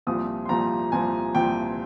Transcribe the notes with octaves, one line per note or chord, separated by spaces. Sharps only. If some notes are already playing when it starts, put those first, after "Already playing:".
C2 A#2 F3 D#6
C6
C2 A#2 F3 A#5
C2 A#2 F3 G#5
C2 A#2 F3 G5